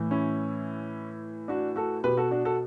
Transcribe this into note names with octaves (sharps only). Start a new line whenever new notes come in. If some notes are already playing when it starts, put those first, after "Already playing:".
Already playing: A2 E3
C#4 E4
D4 F#4
F#4 A4
B2 G4 B4
F#4 A4
D4 F#4
F#4 A4